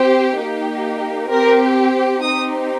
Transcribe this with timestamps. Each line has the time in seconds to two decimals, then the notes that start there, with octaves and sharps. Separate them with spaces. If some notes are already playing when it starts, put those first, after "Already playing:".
Already playing: C4 G4 C5
0.38 A#3 D#4 G4
1.30 C4 G4 A#4
2.22 C4 D#4 G4 D#6